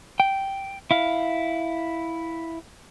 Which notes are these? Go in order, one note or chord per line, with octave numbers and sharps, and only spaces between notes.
G5
E4 F5